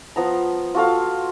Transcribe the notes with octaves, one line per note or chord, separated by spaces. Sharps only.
F3 B3 A#5
F4 F#4 A4 F5